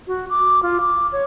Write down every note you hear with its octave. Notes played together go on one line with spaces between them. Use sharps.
F#4
D6
F4
D6
C#5